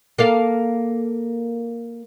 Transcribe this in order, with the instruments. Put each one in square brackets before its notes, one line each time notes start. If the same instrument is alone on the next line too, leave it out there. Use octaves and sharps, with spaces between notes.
[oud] A#3 A4 F5